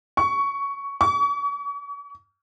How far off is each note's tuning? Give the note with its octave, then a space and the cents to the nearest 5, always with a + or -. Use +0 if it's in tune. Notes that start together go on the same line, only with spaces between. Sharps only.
C#6 +10
C#6 +40